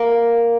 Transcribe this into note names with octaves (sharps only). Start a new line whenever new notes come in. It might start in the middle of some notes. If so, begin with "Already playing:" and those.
Already playing: A#3